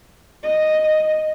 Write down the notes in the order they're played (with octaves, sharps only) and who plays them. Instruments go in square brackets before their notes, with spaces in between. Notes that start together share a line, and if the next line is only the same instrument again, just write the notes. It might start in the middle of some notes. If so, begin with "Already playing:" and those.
[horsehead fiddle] D#5